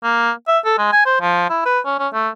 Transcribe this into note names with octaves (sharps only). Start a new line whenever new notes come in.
A#3
E5
A4
G#3
G#5
C5
F3
E4
B4
C#4
C#4
A3